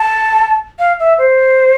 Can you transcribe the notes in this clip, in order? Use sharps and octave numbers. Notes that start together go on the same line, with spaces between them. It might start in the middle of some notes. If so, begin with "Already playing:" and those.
Already playing: A5
F5
E5
C5